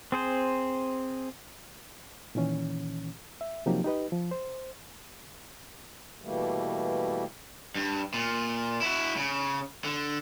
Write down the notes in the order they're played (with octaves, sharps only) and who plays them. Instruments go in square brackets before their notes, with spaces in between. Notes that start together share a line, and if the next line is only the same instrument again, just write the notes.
[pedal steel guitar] C4 G#4 C5
[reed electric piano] A#2 D#3 E3 C#4
E5
C3 F3 F#3 A#3 D#4 G4
D#4 G4 B4 D#5
F3
C5
[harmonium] B2 E3 G3 A3 A#3
[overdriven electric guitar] G2
A#2
E4 F#4
C#3
D3